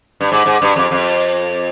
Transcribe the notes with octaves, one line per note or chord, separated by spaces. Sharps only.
G2
G#2
G#2
G2
F2
F2